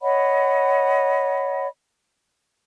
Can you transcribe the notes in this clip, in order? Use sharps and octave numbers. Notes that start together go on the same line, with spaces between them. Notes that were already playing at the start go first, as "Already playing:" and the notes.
C#5 D#5 F#5 B5